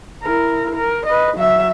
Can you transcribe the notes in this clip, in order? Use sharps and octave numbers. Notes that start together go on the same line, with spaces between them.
E4 A#4
A#4
B4 D#5
F#3 E5